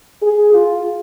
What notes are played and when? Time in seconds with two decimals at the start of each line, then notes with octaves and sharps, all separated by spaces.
0.21 G#4
0.52 F4